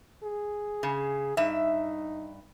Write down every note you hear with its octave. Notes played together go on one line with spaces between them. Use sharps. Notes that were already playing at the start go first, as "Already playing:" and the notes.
G#4
C#3
G2 D#4 E5